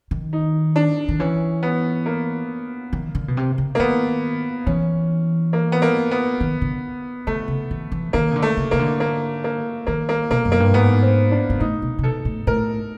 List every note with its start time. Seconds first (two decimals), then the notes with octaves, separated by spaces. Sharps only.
0.11 D#3
0.33 D#4
0.76 D4
1.08 D#3
1.20 E3 C#4
1.63 B3
2.06 A#3
2.93 D#3
3.15 D3
3.28 B2
3.37 C3
3.58 C#3
3.75 A#3
3.79 D#3 B3
4.66 E3 C#4
5.53 A#3
5.72 B3
5.82 A#3
6.11 B3
6.41 D#3
6.62 D3
7.27 D3 A3
7.48 C#3
7.71 D#3
7.92 E3
8.13 D#3 A#3
8.31 C#3
8.36 D3
8.42 A3
8.57 C#3
8.71 C#3 A#3
8.79 D3
9.00 A#3
9.44 A#3
9.87 D#3 A#3
10.09 A#3
10.30 B2 A#3
10.45 F#2
10.52 A#3
10.60 G2
10.74 G#2 B3
11.03 C4
11.31 D4
11.50 G#2
11.60 A2 D#4
11.82 B2
11.99 C3
12.03 B2 A4
12.25 A2
12.47 A2 A#4